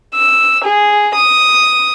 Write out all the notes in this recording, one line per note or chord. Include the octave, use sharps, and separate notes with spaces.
E6
G#4
D#6